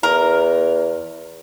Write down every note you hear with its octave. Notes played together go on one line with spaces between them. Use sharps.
E2 A#4